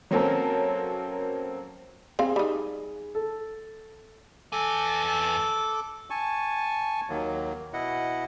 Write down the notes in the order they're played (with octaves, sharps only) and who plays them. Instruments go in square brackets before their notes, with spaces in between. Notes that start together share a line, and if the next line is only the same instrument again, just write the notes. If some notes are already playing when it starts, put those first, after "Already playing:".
[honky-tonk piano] F#3 A#3 C4 C#4 A4 A#4
[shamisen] C4 F5 [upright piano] G#4
[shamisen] G3 D#4
[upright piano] A4
[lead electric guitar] E2 G#5 [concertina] A4 D6
[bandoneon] G#5 A5 C#6
D#2 D#3 F#3 A#3
B2 E4 D#5 F#5